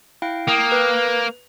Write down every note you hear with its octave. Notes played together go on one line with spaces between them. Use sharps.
E4 F5 G5
A#3 G5 D#6
B4